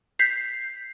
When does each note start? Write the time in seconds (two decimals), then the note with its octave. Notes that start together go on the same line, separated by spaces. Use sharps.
0.19 G6 B6 C7